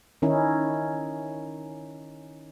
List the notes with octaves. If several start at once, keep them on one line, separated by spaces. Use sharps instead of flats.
D#3 C#4 D#4 E4